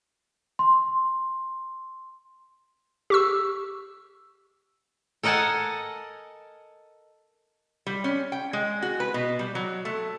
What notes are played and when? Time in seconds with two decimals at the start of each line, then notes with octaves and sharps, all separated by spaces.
0.59 C6
3.10 G4 C#6 E6
5.23 A4 A#4 D#5 F#5 G#5 A5
7.86 G3
8.04 C#4
8.32 G5
8.53 G#3
8.82 F#4
9.00 B4
9.14 B2
9.39 G3
9.55 F#3
9.85 A3